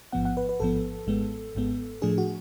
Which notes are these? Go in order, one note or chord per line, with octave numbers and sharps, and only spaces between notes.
A1 G#2 F3 B3 F#5
F#5
B4
B4
A1 G#2 F3 B3 A4
G#1 G#2 G#3 B3
G#1 G#2 G#3 B3
A2 F3 A3 D4 G#4
F#4